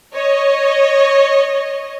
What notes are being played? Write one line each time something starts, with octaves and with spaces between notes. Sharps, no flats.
C#5 D#5